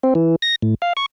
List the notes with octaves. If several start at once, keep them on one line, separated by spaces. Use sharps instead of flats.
C4
E3
A#6
A2
F5
C#6